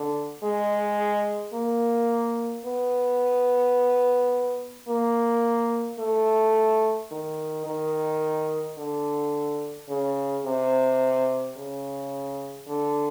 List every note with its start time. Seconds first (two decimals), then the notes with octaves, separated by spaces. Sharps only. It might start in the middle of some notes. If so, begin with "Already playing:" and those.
Already playing: D3
0.43 G#3
1.54 A#3
2.65 B3
4.89 A#3
5.99 A3
7.11 D#3
7.66 D#3
8.78 D3
9.89 C#3
10.45 C3
11.57 C#3
12.68 D3